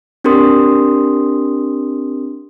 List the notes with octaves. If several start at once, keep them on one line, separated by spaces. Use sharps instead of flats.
C4 D4 G4 A#4 C6 D#6